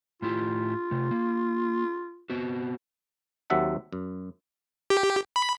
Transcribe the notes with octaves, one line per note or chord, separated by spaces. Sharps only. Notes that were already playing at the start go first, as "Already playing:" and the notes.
A2 E4 F4 G4
C3 A3
A#3
B3 C4 F#4
D#2 F#3 C4 E5 F#5 A5
F#2
G4
B5